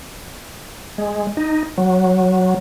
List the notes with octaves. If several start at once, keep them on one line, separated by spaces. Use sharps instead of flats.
G#3
D#4
F#3